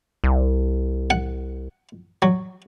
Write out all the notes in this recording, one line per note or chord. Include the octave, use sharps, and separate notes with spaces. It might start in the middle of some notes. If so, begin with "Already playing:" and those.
C2
F#5
F#3